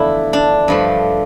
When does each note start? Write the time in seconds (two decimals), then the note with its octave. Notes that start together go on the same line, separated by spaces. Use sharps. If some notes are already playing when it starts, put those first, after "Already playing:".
Already playing: E2 D3 F3 A3 D4 E4 A4
0.33 D4
0.68 G2 F3 A3